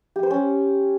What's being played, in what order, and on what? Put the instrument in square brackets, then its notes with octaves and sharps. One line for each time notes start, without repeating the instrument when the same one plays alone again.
[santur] G4
C5
C#4